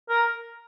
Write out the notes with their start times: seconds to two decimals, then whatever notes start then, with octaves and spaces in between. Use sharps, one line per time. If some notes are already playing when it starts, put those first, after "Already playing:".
0.09 A#4